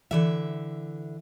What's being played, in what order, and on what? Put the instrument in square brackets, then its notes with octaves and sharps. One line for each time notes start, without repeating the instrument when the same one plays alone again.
[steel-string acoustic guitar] D3 E3 E5